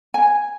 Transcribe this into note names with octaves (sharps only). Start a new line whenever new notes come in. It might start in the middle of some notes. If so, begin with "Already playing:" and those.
G#5